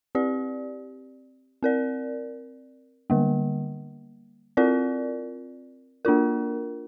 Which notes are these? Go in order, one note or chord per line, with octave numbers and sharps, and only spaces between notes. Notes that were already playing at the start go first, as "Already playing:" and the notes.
C4 G4 D5
C4 A#4 D5
D3 G3 A#3
C4 F4 A#4 D5
A#3 D4 F4 A#4